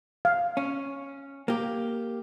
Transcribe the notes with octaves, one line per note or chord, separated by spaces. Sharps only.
F5
C#4
A#3 G4